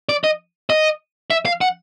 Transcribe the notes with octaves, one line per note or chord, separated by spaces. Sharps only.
D5
D#5
D#5
E5
F5
F#5